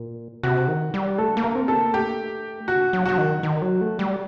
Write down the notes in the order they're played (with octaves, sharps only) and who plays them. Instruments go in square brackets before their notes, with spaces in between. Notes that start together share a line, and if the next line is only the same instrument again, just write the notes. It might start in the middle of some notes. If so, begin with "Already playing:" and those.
Already playing: [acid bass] A#2
[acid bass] C3 [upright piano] F#4
[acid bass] D#3
G3
[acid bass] A3 [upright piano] A4
[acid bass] A#3
[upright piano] A#4
[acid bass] C4
[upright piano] A4
[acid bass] A#3
[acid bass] A3 [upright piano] G4
[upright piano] F#4
[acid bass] F#3
[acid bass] F#3 [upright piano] F#4
[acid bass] D#3
D#3
F#3
A3
G3